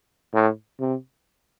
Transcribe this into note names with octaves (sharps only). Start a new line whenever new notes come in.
A2
C3